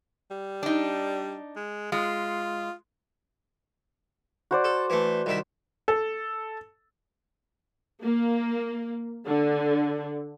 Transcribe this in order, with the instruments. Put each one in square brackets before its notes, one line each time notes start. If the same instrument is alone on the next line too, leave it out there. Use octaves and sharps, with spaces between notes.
[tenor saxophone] G3
[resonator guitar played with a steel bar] D4 D#4
[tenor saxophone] G#3
[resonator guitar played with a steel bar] G#3 [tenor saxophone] F4
[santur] F#4 C5 D5
[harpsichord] A4
E3 A3
C2 D#3 E5
[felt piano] A4
[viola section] A#3
D3